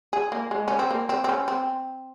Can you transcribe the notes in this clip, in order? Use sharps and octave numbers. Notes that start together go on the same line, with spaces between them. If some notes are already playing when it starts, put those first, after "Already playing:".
G#4
A#3
G#3
C#4
C4
A#3
C4
C4
C#4
C4